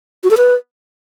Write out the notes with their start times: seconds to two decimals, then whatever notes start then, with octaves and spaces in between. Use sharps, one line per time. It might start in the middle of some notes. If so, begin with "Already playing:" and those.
0.24 F#4
0.31 A4
0.37 B4